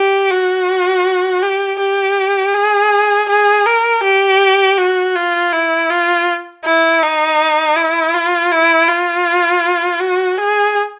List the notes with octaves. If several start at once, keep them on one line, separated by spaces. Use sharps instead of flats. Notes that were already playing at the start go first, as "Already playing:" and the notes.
Already playing: G4
F#4
G4
G4
G#4
G#4
A#4
G4
F#4
F4
E4
F4
E4
D#4
E4
F4
E4
F4
F#4
G#4